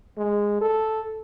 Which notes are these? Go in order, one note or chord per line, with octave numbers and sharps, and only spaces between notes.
G#3
A4